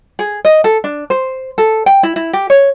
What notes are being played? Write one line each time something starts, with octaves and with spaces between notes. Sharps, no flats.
G#4
D#5
A4
D4
C5
A4
G5
E4
E4
G4
C#5